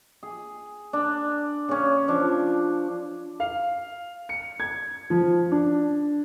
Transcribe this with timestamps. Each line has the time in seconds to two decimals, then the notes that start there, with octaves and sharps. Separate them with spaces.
0.23 G#4
0.93 D4
1.69 C#3 C#4
2.08 F3 D4
3.40 F5
4.29 C#7
4.60 G#6
5.10 F3
5.51 D4